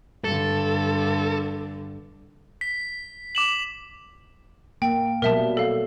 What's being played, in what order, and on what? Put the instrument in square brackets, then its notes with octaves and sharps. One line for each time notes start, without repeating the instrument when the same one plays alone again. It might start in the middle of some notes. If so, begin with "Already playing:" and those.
[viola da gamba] G2 D3 [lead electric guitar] A4
[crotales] B6
D6 E7 F#7
[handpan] A#3 [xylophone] G5
[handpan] B2 F#3 G3 [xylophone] A#4 E5 A5
[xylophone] A4 F5